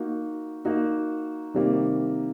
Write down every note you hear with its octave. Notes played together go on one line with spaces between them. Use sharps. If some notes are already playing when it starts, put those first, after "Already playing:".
Already playing: A#3 D#4 F#4
A#3 D#4 F#4
C3 D#3 G3 A#3